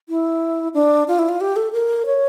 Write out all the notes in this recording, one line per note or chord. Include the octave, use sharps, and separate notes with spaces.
E4
D4
F4
E4
F4
G4
A4
A#4
C#5